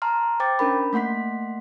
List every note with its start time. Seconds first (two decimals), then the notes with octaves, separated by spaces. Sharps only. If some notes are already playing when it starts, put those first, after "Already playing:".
0.02 A5 A#5 C6 F6
0.40 C5 G5 D6 A6
0.59 C#4 D4 A#4 B5
0.93 A3 A#3 F#5 C6 B6